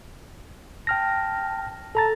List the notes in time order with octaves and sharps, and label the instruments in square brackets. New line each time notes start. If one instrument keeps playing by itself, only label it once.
[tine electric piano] G5 F6 A#6 [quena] A5
[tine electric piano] A4 A#5 A6 [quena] A5